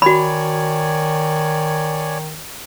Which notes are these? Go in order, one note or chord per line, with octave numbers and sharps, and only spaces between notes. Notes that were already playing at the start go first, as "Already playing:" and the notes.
D#3 F#4 C#5 D5 G#5 B5